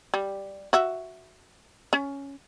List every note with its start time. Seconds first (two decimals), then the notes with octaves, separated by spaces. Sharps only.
0.14 G3
0.73 F#4 E5
1.93 C#4